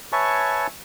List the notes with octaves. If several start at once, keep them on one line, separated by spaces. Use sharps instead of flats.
B4 C#5 E5 G#5 A5 C#6